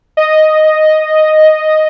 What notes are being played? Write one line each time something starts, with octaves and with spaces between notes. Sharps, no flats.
D#5